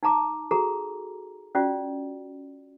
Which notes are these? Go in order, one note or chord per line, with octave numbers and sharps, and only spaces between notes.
D#4 A5 A#5 D6
F#4 G#4 A4 A#5
C#4 F4 F#4 D5